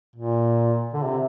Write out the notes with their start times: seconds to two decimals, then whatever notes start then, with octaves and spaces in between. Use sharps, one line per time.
0.16 A#2
0.93 D3
1.03 C3